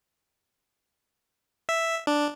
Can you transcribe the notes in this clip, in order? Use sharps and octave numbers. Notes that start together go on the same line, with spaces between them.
E5
D4